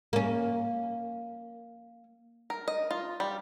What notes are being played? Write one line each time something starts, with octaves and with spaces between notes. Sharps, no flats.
A#3 C#4
A#4
D#5
F4
G3